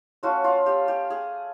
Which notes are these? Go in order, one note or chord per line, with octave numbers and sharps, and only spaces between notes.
A3 C#4 F4 F#4
F4
G4
G4
G#4